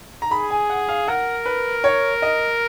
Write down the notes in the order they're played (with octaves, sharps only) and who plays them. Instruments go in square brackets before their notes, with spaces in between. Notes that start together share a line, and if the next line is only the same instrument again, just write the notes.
[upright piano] A#5
[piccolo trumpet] G#4 [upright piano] B5
[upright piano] G#5
F#5
F5
[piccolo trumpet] A#4 [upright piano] F#5
[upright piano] B4
C#5
D#5